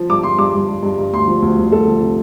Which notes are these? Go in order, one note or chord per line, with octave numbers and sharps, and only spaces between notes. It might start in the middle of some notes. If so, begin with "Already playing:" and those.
Already playing: F3
G2 D6
F3 C6
G2 D6
G2
G2
G2
G2
D2 C6
F3
D2
D2
D2 A4
F3
C3